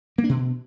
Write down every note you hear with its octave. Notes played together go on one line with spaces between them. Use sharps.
A#3
D4
B2